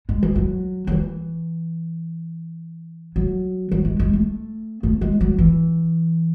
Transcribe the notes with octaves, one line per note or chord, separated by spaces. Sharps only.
G#3
E3
F#3
F#3
E3
F#3
F#3
G#3
G#3
A3
A3
G#3
F#3
E3